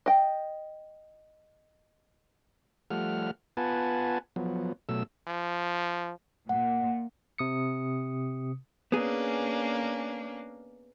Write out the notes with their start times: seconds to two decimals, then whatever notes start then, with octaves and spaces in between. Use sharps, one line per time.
0.06 D#5 G5
2.91 F3 G3 A3 F#5 F6
3.57 B3 F4 B4 F#5 G#5 A5
4.36 F3 F#3 B3
4.89 B2 F#3 A3 E6
5.28 F3
6.49 A#2 F#5
7.38 C3 D#6 C#7
8.92 A#3 B3 C#4 D4 G#4